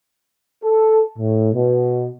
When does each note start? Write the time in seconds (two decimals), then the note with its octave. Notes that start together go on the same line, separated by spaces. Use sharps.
0.64 A4
1.18 A2
1.54 B2